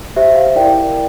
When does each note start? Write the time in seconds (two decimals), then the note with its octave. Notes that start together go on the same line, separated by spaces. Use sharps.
0.16 G4 C5 E5
0.36 F5
0.56 E4 A#4 D5 G5